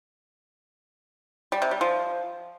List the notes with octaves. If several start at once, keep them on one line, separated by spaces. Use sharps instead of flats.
G3
C3
G3
F3